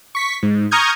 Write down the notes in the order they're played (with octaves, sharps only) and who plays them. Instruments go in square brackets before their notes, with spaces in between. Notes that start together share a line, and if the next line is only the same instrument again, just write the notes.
[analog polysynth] C#6 B6
G#2
A#5 C#6 D#6 F6 G6 G#6